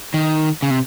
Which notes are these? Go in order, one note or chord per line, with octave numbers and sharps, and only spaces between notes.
D#3
C#3
C3